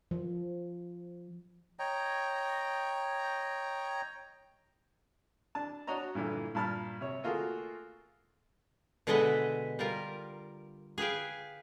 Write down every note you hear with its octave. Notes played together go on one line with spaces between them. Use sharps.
F3
C#5 D#5 G5 A#5
D4 A5
D4 F#4 C#5 D#5 A#5
G2 A#2 D3 E3
G2 A#2 A5 B5 F6
C3 C#5
A3 A#3 F4 F#4 G#4
B2 D3 G#3 B4 D#5 E5
G3 F4 A#4
G#4 B4 F5 G5